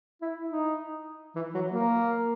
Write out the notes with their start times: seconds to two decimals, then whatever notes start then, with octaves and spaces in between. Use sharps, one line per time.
0.22 E4
0.50 D#4
1.36 E3
1.54 F#3
1.72 A#3